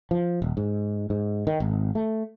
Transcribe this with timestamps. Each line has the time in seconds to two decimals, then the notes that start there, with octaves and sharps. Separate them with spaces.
0.11 F3
0.42 D#1
0.57 G#2
1.10 G#2
1.47 D#3
1.60 G#1
1.95 A3